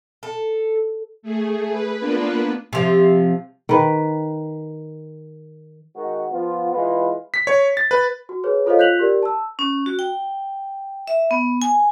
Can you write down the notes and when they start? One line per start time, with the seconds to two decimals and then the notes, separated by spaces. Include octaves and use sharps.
0.23 A4
1.22 A3 G#4
1.70 B4
2.00 A#3 B3 D4 F4 B4
2.73 C3 F3
3.69 D#3 B4
5.94 D#3 G#3 F#4
6.31 F3 B3 F4
6.72 E3 G#3 F4 B4
7.34 B6
7.47 C#5
7.77 A6
7.91 B4
8.29 F#4
8.44 G#4 B4 C#5
8.66 F4 A4 C5 C#5 D#5 F5
8.78 F4 F#6 G6 B6 F7 F#7
8.99 G4 A#4 D5
9.22 A5 E6
9.59 C#4
9.86 F#4
9.99 G5
11.08 E5
11.31 B3
11.62 G#5